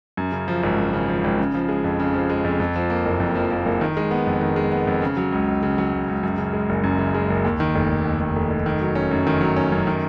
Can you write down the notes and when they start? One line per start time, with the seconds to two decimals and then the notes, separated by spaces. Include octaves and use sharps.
0.17 F#2
0.32 C#3
0.48 F3
0.63 G#1
0.78 F#2
0.93 C#3
1.09 F3
1.24 G#1
1.39 C#3
1.54 F3
1.69 G#3
1.84 F2
2.00 C#3
2.14 F3
2.30 G#3
2.44 F2
2.60 F2
2.76 F3
2.90 A#3
3.06 F#1
3.20 F2
3.35 F3
3.51 A#3
3.66 F#1
3.81 D#3
3.97 G#3
4.11 B3
4.27 F2
4.41 D#3
4.56 G#3
4.72 B3
4.87 F2
5.02 C#3
5.17 F#3
5.32 C#2
5.48 C#2
5.63 C#3
5.78 F#3
5.93 C#2
6.08 C#2
6.23 F#2
6.38 C#3
6.53 G#3
6.69 F#1
6.84 F#2
6.99 C#3
7.15 G#3
7.30 F#1
7.45 D#2
7.60 D#3
7.75 F1
7.90 F1
8.05 D#2
8.21 D#3
8.36 F1
8.50 F1
8.66 D#3
8.81 F#3
8.95 C#4
9.11 F#2
9.27 D#3
9.41 F#3
9.56 C#4
9.72 F#2
9.87 D#3